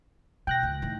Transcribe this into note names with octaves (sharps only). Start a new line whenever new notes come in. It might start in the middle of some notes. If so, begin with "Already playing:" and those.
B2 G5 F#6 A#6
C#2
A2 D#3